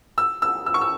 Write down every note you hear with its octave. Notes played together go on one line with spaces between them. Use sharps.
E6
E6
E6
C#6
E6